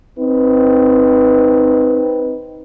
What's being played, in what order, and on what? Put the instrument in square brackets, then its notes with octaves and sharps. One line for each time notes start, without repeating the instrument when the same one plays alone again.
[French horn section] C4 D#4 B4